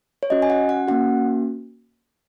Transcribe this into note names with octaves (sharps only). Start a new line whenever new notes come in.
C#5
C#4 F#4 D#5
G#5
F#5
F#5
A#3 C#4 F#4 F#5